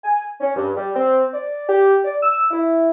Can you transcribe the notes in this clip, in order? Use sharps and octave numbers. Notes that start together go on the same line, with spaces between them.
G#5
C#4
G2
G3
C4
D5
G4
D5
E6
E4